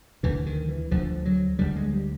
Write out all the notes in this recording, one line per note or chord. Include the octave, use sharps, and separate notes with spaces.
D2 D3 E3
D#3
E3
D2 D3 F3
F#3
D2 D3 G3
G#3
G3